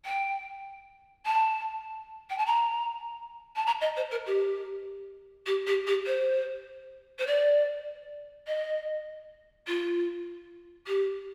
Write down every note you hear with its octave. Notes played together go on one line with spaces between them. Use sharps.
G5
A5
G5
A5
A#5
A5
A#5
D#5
C5
A#4
G4
G4
G4
G4
C5
C5
D5
D#5
F4
G4